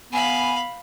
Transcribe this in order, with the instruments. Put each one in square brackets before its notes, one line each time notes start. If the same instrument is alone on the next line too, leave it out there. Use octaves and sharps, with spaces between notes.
[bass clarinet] B3 [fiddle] F5 B5 [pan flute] G#5